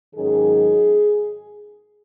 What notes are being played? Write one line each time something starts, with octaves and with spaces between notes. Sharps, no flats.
G#2 D#3 F#3 C#4 G#4